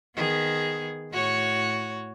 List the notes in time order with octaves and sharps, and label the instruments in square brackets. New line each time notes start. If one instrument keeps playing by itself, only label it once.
[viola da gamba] D#3 B3 G#4
A2 F#4 C#5